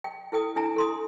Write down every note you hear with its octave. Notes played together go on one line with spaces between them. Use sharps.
G5
E4 A4 G5 D#6
D4 E4 G#5 A#5
A4 C6 D#6